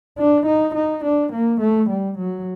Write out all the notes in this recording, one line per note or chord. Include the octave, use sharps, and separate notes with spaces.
D4
D#4
D#4
D4
A#3
A3
G3
F#3